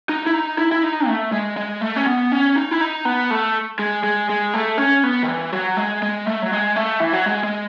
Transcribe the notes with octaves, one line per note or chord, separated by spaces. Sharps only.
D#4
E4
D#4
E4
E4
D#4
A3
G#3
G#3
A3
C#4
B3
C#4
D#4
E4
D#4
B3
A3
G#3
G#3
G#3
A3
C#4
B3
D#3
E3
F#3
G#3
G#3
A3
F#3
G#3
A3
E3
F#3
G#3
G#3